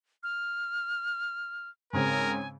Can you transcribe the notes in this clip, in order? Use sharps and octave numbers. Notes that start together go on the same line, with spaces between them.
F6
G#2 C#3 C4 A#4 G#5